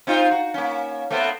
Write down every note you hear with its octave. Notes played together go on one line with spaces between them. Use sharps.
C4 D#4 F4
F#4
A#3 C#4
A3 B3 C4